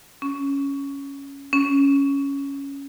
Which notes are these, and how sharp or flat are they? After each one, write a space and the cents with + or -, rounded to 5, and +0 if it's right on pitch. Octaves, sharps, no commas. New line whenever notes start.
C#4 +5
C#4 +5